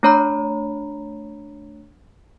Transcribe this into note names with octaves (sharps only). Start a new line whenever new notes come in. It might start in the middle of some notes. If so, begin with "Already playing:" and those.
A3 D4 C#5 A#5 B5